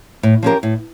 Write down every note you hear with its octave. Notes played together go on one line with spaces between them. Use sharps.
A2
F3 C#4 G4 A#4
A2